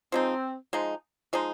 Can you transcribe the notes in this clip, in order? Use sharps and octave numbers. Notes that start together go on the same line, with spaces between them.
F3 G#3 C4 D#4
F3 G#3 D#4
F3 G#3 D#4